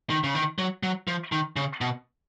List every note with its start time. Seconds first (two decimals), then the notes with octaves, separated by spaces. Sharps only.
0.10 D#3
0.24 C#3
0.35 D#3
0.58 F#3
0.83 F#3
1.07 F3
1.32 D#3
1.56 C#3
1.81 B2